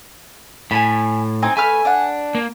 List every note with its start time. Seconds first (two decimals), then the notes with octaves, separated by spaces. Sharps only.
0.71 A2 G#5 A5 B5
1.42 C4 D#4 G#5
1.57 A3 B4 G#5 F6
1.85 D4 F#5
2.35 A#3